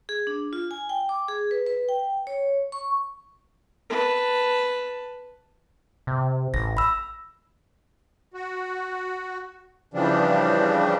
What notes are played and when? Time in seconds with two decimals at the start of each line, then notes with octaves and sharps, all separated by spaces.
0.09 G#4
0.27 D4
0.53 F4
0.71 G#5
0.89 G5
1.09 D6
1.28 G#4
1.51 B4
1.66 B4
1.89 G5
2.27 C#5
2.72 C#6
3.90 B4 A5
6.07 C3
6.54 A1 A#6
6.77 B5 E6
8.34 F#4
9.94 C#3 E3 F3 G3 D4